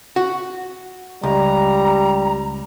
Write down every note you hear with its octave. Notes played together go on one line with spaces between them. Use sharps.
F#4
C#2 G3 A#5